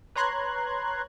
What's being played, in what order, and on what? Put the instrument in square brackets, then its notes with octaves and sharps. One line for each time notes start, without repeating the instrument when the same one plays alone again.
[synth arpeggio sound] B4 C#5 A#5 C6 F#6 G#6